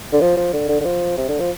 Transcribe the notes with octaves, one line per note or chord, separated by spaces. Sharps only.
D3
F3
F3
D3
D3
D3
F3
C3
D3
F3